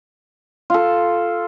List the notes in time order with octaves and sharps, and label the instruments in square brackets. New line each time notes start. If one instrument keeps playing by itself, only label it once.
[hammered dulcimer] F4 A4